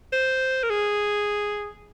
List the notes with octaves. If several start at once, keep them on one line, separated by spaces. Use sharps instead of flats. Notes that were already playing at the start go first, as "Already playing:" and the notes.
C5
A#4
G#4